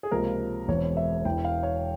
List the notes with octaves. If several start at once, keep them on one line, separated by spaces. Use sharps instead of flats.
G#4
C#2 C3 F3 A#3 A#4
E1 E2 E3 G#3 C4 C#5
E5
E1 E2 E3 G5
F5
C#5